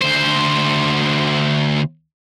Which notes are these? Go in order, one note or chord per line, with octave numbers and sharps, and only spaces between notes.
D2 C5